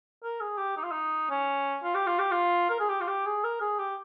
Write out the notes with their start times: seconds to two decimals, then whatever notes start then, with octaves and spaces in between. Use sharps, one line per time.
0.23 A#4
0.41 G#4
0.58 G4
0.77 D#4
0.84 F4
0.91 D#4
1.30 C#4
1.83 F4
1.94 G4
2.06 F4
2.19 G4
2.31 F4
2.70 A#4
2.80 G#4
2.89 G4
3.01 F4
3.08 G4
3.26 G#4
3.44 A#4
3.61 G#4
3.79 G4